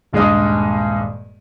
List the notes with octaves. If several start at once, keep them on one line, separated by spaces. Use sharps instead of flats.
D#1 G2 G#3 G#4 D#5 D#6